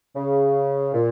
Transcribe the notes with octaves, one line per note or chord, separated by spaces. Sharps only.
C#3
A#2